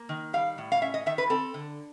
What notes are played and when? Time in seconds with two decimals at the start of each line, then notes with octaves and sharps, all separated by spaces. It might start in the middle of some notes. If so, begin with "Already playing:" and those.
Already playing: A#3
0.09 D#3
0.33 G3 F5
0.58 A2
0.72 F5
0.82 C#4 E5
0.94 D#5
1.06 D#3 E5
1.18 B4
1.30 C4 A4
1.54 D3